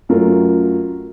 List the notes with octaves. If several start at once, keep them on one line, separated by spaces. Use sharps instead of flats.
F#2 F#3 A3 F4 A#4